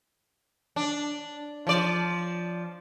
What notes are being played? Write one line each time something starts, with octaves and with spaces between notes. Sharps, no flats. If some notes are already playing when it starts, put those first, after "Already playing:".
D4
F3 D5